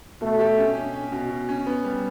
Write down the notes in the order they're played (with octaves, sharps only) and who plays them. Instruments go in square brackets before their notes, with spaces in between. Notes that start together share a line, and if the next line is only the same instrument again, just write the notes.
[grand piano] B2 [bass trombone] A3
[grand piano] G4
C#4
C#4
C#4
B2
B2
C#4
B3
G3